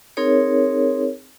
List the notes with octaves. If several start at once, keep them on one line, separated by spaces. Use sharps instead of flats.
C4 D#4 G#4 A#4 C#5